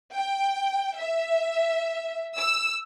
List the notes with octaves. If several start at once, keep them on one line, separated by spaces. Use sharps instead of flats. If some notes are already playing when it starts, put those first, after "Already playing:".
G5
E5
E6